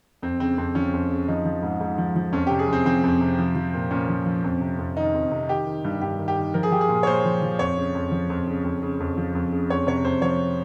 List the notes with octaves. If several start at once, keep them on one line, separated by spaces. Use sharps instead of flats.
F2 C4
C#3 C4
F2 C4
F3 C#4
F2
C#3
F3 D#4
F3
G#2
G#2
F3
F3
F2 C#4
C3 G4
G#4
F2 C4
F3 C4
F2
C3
F3
F3
A#2
A#2 C#4
F3
F3
F2
C3
F2
D#3 D#4
F2
C3
D#3 G4
D#3
G2
G2 G4
D#3
G4
D#3
F3 A#4
G#4
F3 G4
G#4
A#2
C#5
A#2 C5
F3
F3
F2 C#5
C#3
F2
F3
F2
C#3
F2
C#3
F2
F3
F2
C#3
F2 C#5
C3 C#5
F2 C5
F3 C#5